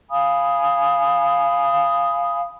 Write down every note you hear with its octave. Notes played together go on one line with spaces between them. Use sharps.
F5 G#5 B5 D#6